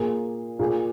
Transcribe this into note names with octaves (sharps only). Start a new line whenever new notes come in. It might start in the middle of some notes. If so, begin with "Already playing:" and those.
Already playing: A#2 A#3 F4 G#4
A#2 A#3 G#4